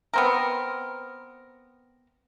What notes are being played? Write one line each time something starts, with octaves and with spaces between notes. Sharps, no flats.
B3 C4 A#4